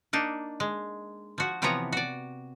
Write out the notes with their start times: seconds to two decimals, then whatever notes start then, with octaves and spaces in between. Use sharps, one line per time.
0.13 A#3 D4 D#4
0.60 G#3
1.38 F3 F#4
1.62 C3 E3 F3 B3 C#5 A#5
1.92 F#4 D5